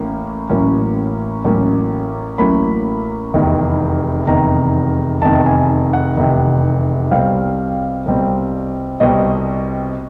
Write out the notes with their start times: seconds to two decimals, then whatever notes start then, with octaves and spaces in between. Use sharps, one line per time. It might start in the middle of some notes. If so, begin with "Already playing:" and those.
Already playing: A1 A2 A#3 C#4
0.49 A1 A2 F#3 A#3 C#4
1.45 A1 A2 F#3 A#3 C#4
2.38 A1 A2 F#3 A#3 C#4 B5
3.34 F1 E2 C3 D#3
4.27 F1 E2 C3 D#3 A#5
5.22 F1 E2 C3 D#3 A5
5.46 G#5
5.93 F#5
6.17 F1 E2 C3 D#3
7.11 C2 B2 G3 C4 F5
8.06 C2 B2 G3 C4
9.00 C2 B2 G3 C4 D#5